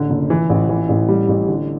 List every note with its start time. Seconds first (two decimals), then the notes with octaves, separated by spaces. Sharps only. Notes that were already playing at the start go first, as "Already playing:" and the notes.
Already playing: A1 D3
0.10 F#1
0.30 E3
0.49 A1
0.69 E3
0.89 A1
1.08 G3
1.29 A1
1.48 D3